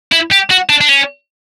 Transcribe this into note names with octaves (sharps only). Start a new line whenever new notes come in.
E4
G4
F#4
D4
D4
C#4